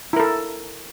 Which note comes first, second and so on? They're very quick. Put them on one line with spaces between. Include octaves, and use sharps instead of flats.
E4 A#4 A4